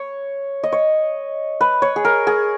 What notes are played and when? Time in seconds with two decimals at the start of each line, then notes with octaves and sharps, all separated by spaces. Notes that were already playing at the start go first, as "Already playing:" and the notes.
Already playing: C#5
0.64 D#5
0.72 C#5
1.61 B4
1.82 C#5
1.96 G#4
2.05 A#4
2.27 G#4